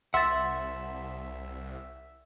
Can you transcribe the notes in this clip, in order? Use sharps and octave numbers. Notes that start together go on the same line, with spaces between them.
C2 E5 F#5 C6 A6